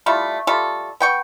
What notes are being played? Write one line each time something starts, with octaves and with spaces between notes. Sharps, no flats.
G3 A3 E4 F4
G3 A3 F4 A4
B3 G5 C#6